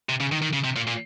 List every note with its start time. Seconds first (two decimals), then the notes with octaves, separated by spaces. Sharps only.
0.09 C3
0.20 C#3
0.32 D#3
0.42 D#3
0.53 C#3
0.64 C3
0.76 A#2
0.87 A#2